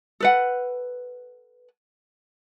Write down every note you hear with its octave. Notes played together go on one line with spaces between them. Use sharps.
A4 B4 F#5